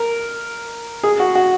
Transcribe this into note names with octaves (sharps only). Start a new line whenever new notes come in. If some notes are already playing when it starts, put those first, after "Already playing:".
Already playing: A#4
G#4
F#4
F#4